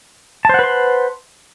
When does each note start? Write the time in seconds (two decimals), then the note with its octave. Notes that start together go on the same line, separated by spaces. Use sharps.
0.45 A5
0.49 C5
0.54 F#5
0.59 B4
0.64 C6